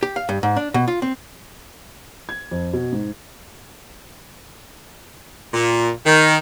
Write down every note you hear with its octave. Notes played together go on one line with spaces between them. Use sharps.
G4
F5
G2
G#2
D4
B2
F4
C4
G#6
F2
B2
G#2
A#2
D#3